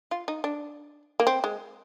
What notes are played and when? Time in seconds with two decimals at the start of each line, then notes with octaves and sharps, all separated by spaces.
0.11 F4
0.28 D#4
0.44 D4
1.20 A#3
1.27 C4
1.44 G#3